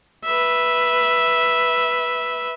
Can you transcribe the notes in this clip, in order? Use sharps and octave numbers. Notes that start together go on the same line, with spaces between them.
B4 E5